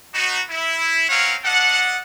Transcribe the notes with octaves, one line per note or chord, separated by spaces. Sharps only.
B3 D#4 F#4
E4
C4 C#4 A#4 C#5 F5 F#5
D4 A4 D#5 F#5